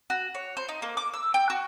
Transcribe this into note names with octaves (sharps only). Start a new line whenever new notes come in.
F#4
C#5
C5
D#4
A#3
D6
E6
G5
F#4